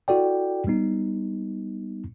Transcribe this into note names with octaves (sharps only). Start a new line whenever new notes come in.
E4 F#4 A4 D5 G5
G3 B3 D#4